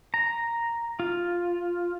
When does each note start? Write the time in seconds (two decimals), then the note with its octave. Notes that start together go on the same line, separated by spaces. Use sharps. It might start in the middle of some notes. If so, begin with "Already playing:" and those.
0.14 A#5
1.00 F4